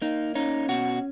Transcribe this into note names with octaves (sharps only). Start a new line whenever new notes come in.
A#3 D#4
C#4 D#4
B2 F#4